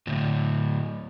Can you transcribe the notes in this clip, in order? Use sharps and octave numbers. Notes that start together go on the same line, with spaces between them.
D2 A2